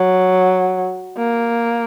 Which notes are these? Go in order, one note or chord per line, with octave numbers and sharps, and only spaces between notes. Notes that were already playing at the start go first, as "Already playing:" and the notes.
Already playing: F#3
A#3